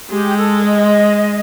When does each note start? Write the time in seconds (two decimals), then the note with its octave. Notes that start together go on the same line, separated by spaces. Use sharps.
0.10 G#3 G4
0.37 A4
0.64 D#5